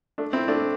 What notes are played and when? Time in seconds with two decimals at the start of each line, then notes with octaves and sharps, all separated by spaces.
0.18 A3 D4
0.33 C4 E4
0.48 A3 D4